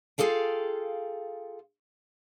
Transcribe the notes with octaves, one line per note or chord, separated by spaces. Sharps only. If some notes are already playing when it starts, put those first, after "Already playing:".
F4 G#4 A4 F5 G5